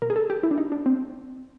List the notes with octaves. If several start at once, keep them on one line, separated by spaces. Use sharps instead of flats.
B2 A#4
G#4
A4
G4
E4
D4
D#4
D4
C4